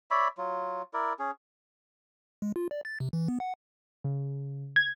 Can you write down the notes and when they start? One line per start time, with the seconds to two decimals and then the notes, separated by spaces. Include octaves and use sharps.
0.11 C#5 D5 E5 B5
0.38 F#3 F4
0.94 E4 A#4 D5
1.19 C#4 G#4
2.42 G#3
2.56 F4
2.71 D5
2.85 A6
3.00 C3
3.13 E3
3.28 B3
3.40 F#5
4.04 C#3
4.76 G#6